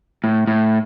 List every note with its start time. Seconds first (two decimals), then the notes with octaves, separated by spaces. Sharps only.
0.24 A2
0.47 A2